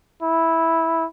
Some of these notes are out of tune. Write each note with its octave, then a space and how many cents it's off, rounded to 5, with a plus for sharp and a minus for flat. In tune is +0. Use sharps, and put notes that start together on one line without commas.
E4 -10